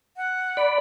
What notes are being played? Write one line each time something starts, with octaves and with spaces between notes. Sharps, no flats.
F#5
D5 B5